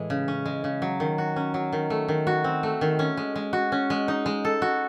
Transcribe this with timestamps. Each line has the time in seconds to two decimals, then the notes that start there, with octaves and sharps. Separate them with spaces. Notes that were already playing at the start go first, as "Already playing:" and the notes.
Already playing: A2 E3 G#3
0.10 C#3
0.28 C#4
0.46 G#3
0.64 C#3
0.82 F#3
1.00 D#3
1.18 F#4
1.36 C#4
1.54 F#3
1.73 D#3
1.90 A3
2.08 D#3
2.27 F#4
2.44 C4
2.63 A3
2.81 D#3
2.99 C#4
3.17 G#3
3.36 G#3
3.53 F#4
3.72 C#4
3.90 G#3
4.08 D#4
4.26 G#3
4.45 A4
4.62 F#4